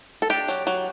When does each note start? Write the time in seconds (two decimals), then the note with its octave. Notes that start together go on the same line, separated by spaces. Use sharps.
0.22 A4
0.30 D4 G4
0.48 F#3
0.67 F#3